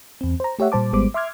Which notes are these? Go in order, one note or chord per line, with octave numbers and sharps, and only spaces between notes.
E2 C4
C5 A#5
A3 G4 C#5 E5 F#5
A#2 G3 C5 A5 D6
G#1 G3 G#3 B3 C5 D6
E5 C6 D6 F6 G#6